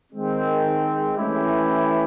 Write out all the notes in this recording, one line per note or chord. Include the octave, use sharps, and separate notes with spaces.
D#3 G#3 C4
E3 A3 C#4 E4 G4